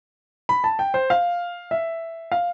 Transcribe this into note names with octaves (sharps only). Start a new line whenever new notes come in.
B5
A5
G5
C5
F5
E5
F5